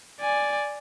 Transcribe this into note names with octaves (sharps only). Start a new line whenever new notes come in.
D5 G#5